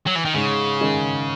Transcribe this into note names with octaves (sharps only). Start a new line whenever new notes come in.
F#3
E3
D#3
G#2 C#3
D#3 G#3 C#4